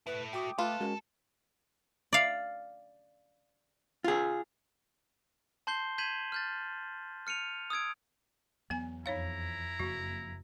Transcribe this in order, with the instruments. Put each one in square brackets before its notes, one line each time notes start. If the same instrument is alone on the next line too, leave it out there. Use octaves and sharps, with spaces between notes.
[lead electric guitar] A3 E4 [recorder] B4
[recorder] F#4 [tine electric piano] G5 D6 D#6
[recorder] A3 [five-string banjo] F4 B4 [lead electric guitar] A4
[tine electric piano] G#3 F#4 A#4 [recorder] C#4
[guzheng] D5 F5
[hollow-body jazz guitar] F4 G#4
[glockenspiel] A5 C6 G6 C7 G7
G6 G#6 B6 D#7 E7 F#7
F6 G6 A6
F6 C#7 D#7 F7
D#6 E6 G#6 D7
[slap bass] E2 F#3 [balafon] B3 G#5
[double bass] F2 [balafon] D#4 C#5 F5 [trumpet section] E4 A#5
[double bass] F#1 [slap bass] F2 A#3 [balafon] F#4